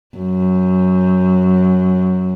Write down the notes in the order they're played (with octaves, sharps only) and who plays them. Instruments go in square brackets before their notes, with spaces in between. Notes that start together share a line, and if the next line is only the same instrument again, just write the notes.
[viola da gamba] F#2